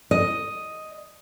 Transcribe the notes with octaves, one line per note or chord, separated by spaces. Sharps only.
D#5